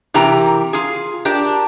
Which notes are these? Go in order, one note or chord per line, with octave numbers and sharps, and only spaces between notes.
C3 E3 G4 A#4 A#5
F4 G#4
D4 G4 A#4 D5